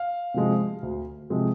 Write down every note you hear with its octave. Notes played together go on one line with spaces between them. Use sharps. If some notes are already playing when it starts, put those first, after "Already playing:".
Already playing: F5
C3 F3 G#3
D2
C3 F3 G#3